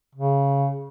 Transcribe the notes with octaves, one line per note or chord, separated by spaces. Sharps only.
C#3